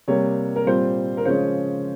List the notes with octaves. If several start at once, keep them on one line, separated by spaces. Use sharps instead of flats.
C3 G3 A#3 C#5
A#4
A#2 G3 C4 C5
A#4
C#3 F3 G#3 C#4 C5